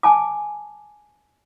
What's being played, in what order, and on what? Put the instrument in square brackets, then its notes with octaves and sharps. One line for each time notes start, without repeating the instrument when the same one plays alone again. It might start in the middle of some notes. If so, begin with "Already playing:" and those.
[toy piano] G#5 A5 D6